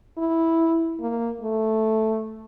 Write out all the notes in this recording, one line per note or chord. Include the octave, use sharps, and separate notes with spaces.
E4
A#3
A3